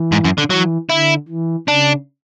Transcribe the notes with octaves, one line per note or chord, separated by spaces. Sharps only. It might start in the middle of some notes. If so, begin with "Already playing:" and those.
Already playing: E3
G#2
F#2
D3
E3 F#3
D3 E4
E3
C#3 D4